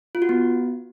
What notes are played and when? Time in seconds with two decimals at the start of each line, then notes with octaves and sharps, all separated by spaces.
0.15 F4
0.22 F#4
0.29 B3